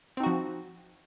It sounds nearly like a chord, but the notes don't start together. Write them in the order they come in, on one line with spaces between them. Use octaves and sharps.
C4 D#4 F#4 F3